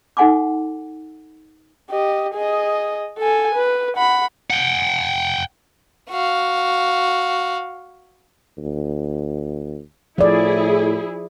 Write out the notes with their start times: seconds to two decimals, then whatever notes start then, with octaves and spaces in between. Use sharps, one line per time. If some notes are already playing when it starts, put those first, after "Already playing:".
0.17 D#4 A4 F#5 G#5 C6 D6
1.90 G4 D#5
2.34 G#4 D#5
3.18 A4 G#5
3.55 B4
3.97 F#5 B5
4.50 F#5 G5
6.10 F#4 F5
8.58 D2
10.18 A2 F3 E4 G#4 D5